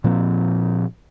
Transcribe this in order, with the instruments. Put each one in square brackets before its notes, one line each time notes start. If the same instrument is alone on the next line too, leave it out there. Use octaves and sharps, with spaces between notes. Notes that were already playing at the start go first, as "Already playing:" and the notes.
[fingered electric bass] A#2 F3 A#3 C4